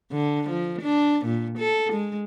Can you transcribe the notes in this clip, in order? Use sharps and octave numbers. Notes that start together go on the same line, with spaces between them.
D3
F3
D4
A#2
A4
G#3